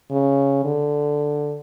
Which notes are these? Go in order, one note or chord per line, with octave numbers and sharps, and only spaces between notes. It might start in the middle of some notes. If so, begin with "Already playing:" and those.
C#3
D3